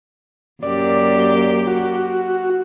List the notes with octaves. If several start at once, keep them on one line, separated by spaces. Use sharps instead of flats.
F#2 A#3 G4 D5
F#4